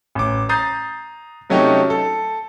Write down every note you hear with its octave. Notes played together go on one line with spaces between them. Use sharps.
A1 D6
A#5 D#6 G6 A6 C7
C3 F#3 A3 C#4 D#4 G4
A4